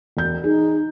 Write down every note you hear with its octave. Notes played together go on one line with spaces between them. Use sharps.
E1 G6
D#4 G#4